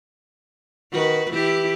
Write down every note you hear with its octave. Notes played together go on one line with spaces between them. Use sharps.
D#3 F#4 B4
E3 E4 G4